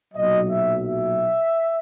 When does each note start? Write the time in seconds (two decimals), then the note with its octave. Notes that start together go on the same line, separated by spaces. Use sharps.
0.14 B1 A#2 F#3 D#5
0.50 E5
0.87 E5